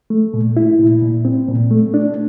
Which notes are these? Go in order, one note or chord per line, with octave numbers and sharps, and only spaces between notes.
A3
A#2
E4
A#2
A#2
C4
A#2
A3
D4